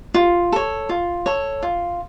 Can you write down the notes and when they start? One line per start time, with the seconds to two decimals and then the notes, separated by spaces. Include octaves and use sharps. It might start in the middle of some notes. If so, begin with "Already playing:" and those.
0.14 F4
0.52 A4 C#5
0.89 F4
1.26 A4 C#5
1.63 F4